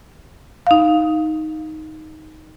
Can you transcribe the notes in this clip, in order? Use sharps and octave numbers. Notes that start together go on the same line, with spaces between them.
D#4 F5